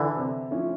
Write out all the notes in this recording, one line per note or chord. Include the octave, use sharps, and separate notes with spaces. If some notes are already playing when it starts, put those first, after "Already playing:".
Already playing: D3 E3
C3
F3 A3 C#4 E4